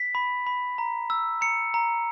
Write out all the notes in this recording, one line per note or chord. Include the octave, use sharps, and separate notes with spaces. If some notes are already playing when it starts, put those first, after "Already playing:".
Already playing: B6
B5
B5
A#5
E6
A#5 C#7
A#5